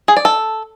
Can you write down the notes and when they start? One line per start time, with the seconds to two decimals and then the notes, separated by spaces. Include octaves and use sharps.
0.08 G#4
0.17 D5
0.25 A4